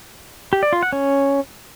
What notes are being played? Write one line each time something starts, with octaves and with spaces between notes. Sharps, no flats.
G4
D5
F4
F#5
C#4